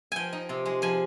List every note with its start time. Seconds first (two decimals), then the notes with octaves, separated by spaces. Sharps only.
0.12 F3 G5 G#5
0.33 D#4
0.49 C3
0.66 G#3
0.82 F3 G#5